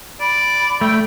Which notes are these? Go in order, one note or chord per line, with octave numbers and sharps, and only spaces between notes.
D5 B5
A3 G5